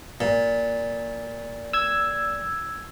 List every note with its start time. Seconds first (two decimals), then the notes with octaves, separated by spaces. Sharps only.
0.21 A#2
1.73 E6 G#6